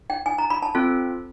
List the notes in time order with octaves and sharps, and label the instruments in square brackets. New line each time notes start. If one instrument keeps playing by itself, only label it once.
[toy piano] G5
G#5
A#5
B5
A5
[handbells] C4 F4 A4